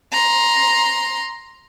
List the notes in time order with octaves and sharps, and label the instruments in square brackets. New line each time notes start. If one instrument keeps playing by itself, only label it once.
[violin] A#5 C6